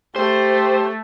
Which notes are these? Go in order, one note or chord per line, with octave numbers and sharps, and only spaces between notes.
A3 G4 C5